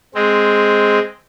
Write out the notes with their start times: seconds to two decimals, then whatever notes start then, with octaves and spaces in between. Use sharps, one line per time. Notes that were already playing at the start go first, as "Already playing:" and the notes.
0.15 G#3 C4